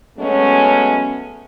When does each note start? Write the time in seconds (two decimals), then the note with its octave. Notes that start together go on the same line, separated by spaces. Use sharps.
0.18 F#3 G#3 A3 B3 C#4